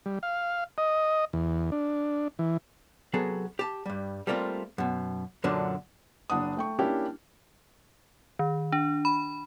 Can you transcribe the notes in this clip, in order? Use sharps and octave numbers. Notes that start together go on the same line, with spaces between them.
G3
F5
D#5
E2
D4
E3
C3 F#3 B3 G#4 A4
G4 A5
G2 G3
G3 A3 A#3 C4 F4
F#2 B2
F#2 A#2 D3 F#3 D4
F#1 D4 F#5 D#6
A3 G5 C#6
A#3 C#4 D4 E4 G4
D#3
D4
B5